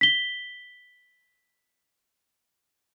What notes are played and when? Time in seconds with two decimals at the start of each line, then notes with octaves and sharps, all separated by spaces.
0.01 B6 G7